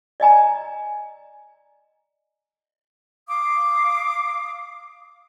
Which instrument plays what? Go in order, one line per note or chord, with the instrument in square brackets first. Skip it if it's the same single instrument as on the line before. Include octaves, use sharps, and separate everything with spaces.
[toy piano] D5 D#5 G#5 A#5
[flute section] F5 D6 D#6